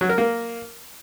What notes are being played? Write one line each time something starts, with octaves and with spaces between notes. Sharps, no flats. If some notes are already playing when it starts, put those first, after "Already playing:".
F#3
A#4
A#3